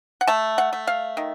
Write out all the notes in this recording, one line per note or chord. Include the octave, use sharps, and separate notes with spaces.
F#5
A3 A5
F#5
A3
F5
D#3